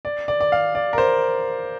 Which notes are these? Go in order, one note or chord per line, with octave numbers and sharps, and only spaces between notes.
D5
D5
D5
F5
D5
A#4
C5